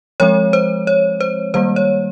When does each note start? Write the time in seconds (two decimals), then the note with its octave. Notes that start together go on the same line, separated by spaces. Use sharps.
0.20 F3 G#3 C4 C#5
0.53 C5
0.87 C#5
1.21 C5
1.54 D#3 G3 A#3 C5
1.76 C#5